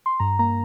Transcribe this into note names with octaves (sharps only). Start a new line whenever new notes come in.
C6
G2 A#5
A#3 A#5